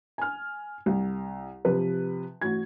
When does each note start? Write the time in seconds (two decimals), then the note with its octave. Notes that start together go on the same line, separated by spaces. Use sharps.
0.18 G#5 F6
0.86 C2
1.65 C3 F3 B4
2.41 A1 F#4 G#6